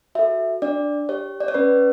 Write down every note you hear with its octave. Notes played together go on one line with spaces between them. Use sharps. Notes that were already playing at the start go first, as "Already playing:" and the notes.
F#4 A4 E5
D4 D5
G4 C#5
D5
C#5
C#4 B4